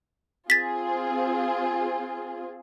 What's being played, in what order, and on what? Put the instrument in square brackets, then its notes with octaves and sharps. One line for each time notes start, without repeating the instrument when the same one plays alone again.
[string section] C4 F4 G#4 [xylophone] A6 B6